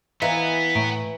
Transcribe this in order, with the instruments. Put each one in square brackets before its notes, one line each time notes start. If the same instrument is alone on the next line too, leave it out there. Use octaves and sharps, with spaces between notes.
[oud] E3 [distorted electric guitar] B3 [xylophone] D#5 F5 A#5
[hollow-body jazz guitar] A2 [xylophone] A#5 D7